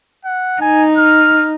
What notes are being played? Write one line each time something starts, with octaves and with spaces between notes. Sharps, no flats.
F#5
D#4 G#5
F6